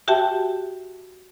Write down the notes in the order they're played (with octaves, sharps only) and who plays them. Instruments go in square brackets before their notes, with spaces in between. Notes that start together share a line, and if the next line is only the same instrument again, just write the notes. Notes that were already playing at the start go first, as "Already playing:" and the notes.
[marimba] F#4 G4 E5 G5 A5